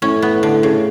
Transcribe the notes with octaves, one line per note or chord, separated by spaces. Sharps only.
A2 C#4
B3
D3
C#3